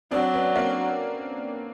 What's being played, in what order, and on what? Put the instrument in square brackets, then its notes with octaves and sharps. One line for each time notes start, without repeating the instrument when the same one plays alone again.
[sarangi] F#3 [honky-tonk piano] C4 D4
[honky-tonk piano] B3 C#4
A#3 C4